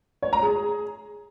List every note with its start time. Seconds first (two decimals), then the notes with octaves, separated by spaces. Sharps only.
0.23 C#5
0.33 A#5
0.43 G#4